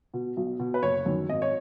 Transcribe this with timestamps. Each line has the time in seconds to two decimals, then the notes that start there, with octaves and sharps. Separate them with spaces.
0.14 B2
0.37 B1
0.59 B2
0.74 B4
0.83 F#1 C#5
1.06 F#2 D#3
1.29 G#1 D#5
1.42 C#5